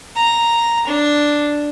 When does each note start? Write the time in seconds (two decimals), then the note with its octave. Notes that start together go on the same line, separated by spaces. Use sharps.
0.16 A#5
0.87 D4